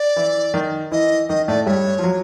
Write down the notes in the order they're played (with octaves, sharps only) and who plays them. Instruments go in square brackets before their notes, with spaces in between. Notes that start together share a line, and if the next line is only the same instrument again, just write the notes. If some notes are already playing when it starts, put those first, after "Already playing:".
Already playing: [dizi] D5
[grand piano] E3 E4
D#3 D#4
[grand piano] E3 E4 [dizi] D#5
[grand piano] D#3 D#4 [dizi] D#5
[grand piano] A2 A3 [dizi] D5
[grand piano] G2 G3 [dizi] C#5
[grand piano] F3
F#3